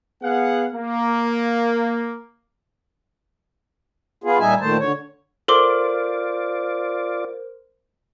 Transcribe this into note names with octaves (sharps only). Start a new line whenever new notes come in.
B3 G#4 F5 F#5
A#3
B3 F4 G#4
A#2 G3 D#4 E5 G#5
A#2 D#3 A3 C5 A5
D3 C#5
F4 A4 A#4 C5 D5 C6 D6